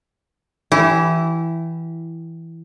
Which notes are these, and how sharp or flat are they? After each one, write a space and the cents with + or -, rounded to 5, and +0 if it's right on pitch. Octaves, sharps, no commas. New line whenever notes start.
E3 +0 E4 +10 G4 -30